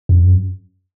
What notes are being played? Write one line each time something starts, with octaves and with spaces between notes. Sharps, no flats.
F2
F#2